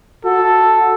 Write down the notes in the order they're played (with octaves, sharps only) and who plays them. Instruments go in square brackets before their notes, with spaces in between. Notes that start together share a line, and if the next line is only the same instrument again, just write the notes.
[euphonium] F#4 [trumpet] A4